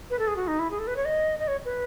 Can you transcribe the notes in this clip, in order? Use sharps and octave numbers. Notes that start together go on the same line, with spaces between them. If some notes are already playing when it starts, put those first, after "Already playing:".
B4
A4
G#4
F#4
D#4
E4
G#4
A4
B4
C#5
D#5
D#5
C#5
B4